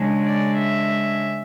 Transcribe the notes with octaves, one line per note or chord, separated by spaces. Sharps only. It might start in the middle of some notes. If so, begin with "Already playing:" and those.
Already playing: C#3 G#3 D4
D5
E5